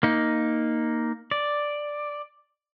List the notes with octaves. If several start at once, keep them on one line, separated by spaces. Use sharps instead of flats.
A#3 D#4
D5